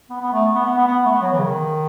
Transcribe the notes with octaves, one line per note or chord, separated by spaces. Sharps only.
B3
B3
A3
B3
B3
B3
B3
A3
B3
F#3
E3
C#3
D#3